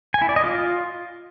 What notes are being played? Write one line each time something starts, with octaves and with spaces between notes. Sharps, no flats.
G#5
E4
D5
D#5
F4